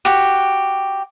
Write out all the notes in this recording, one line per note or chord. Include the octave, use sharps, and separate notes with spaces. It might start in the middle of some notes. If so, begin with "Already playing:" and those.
F#4 G4